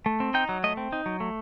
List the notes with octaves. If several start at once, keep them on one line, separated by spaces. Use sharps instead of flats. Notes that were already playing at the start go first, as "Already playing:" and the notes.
A3
C4
D#4 G5
F#3
A3 D#5
C4
D#4
F#3
A3